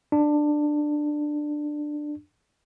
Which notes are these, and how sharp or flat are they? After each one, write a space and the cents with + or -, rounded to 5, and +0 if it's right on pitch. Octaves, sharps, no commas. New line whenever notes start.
D4 +15